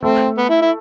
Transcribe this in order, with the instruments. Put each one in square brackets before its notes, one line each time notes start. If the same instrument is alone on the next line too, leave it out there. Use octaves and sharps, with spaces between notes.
[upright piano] A3 [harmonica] C4
[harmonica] B3
E4
E4